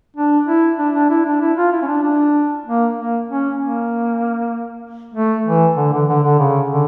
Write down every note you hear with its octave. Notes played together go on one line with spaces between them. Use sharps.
D4
E4
D4
D4
E4
D4
E4
F4
E4
C#4
D4
D4
A#3
A#3
C#4
A#3
A3
E3
D3
D3
D3
D3
C#3
D3